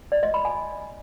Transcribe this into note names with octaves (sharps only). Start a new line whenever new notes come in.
D5
D#5
B5
G#5